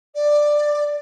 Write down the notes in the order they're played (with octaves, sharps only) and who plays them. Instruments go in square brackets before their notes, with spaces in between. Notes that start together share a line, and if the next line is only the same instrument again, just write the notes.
[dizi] D5